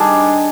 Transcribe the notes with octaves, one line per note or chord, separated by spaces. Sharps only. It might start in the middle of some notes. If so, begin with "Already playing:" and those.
Already playing: D#3 G3 D4 G#4